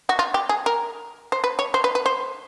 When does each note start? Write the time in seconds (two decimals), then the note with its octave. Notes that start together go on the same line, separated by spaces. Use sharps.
0.09 F#4
0.19 F4
0.34 G4
0.49 G#4
0.66 A#4
1.32 C5
1.44 B4
1.59 C#5
1.74 C5
1.84 B4
1.95 B4
2.06 C5